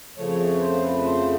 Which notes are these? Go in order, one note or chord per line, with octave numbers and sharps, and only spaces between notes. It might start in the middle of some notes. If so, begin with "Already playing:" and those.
F2 C#3 F3 A3 C#5
C#5
B4
C5
B4
C5